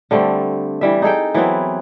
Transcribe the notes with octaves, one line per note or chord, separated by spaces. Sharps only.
D3 G3 A3 C4
E3 G3 E5
D#4 G#4 A4 G5
E3 F#3 B3 C4